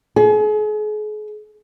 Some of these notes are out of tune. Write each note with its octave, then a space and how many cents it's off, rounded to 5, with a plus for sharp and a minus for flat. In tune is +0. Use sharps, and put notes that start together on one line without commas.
G#4 +40